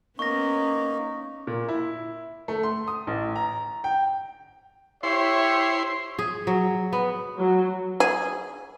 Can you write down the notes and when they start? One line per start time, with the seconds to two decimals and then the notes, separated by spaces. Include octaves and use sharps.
0.19 A#3 B3 C#4 D#4 C#6 A#6
1.47 A#2
1.69 E4
2.48 A3
2.63 C6
2.88 D#6
3.07 A1
3.36 A#5
3.84 G5
5.03 E4 G4 C5 C#5 E5 C6
6.19 G#4
6.47 F#3
6.93 B3
7.37 F#3
8.00 G#4